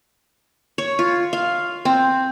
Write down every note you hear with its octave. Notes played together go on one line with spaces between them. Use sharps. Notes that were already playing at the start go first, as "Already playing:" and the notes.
C#5
F4
F5
C4